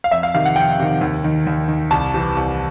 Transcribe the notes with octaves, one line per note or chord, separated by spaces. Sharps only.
F5
F2 E5
F5
C3 D#3 F5
F#5
F2 G5
C3 D#3
D#2
D#3
D#2
D#3
C2 A5
C3 E3
C2